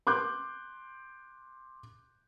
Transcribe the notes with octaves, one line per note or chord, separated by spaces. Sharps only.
C6 D6 F#6 G6